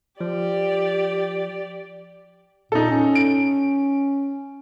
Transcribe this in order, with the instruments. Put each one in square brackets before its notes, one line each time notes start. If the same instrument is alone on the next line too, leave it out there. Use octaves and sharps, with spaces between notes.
[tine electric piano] F3 [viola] G4 D5
[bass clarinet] A#2 [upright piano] D#4 A4
[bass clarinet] C#4
[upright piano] D7